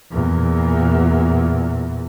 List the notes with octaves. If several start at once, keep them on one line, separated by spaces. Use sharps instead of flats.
E2 A#2